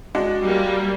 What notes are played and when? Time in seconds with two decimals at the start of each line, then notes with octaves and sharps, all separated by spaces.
0.15 G#3 D4 F#4
0.45 G3 A#3